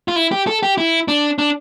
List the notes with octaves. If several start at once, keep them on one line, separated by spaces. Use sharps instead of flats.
F4
E4
G4
A4
G4
E4
D4
D4